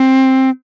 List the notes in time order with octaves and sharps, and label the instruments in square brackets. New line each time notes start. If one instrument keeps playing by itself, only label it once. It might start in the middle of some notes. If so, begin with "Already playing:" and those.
Already playing: [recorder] C4